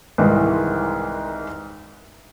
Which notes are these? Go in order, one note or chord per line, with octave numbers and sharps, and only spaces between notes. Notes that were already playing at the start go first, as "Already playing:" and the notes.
C2 G#2 D#3 E3 G#3